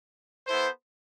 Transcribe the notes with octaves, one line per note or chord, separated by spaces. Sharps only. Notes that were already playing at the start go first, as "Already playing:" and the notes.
B3 E4 A4 C5